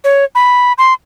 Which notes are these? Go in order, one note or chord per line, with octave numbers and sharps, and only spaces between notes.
C#5
B5
C6